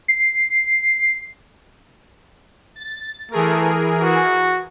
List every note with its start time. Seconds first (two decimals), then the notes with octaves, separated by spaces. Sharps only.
0.08 C7
2.76 A6
3.32 E3 A3 G#4 A#4
4.01 F#4